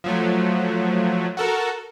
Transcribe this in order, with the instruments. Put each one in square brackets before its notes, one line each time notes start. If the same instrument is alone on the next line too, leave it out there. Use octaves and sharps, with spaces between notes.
[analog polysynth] F3 F#3 A3
F#4 A4 A#4